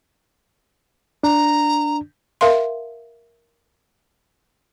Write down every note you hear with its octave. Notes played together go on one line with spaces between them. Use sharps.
D4 A#5
A#4 E5 F5 C6